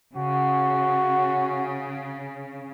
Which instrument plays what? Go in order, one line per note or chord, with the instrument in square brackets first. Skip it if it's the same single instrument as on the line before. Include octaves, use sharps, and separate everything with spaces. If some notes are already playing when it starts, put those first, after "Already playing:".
[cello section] C#3 [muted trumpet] F#4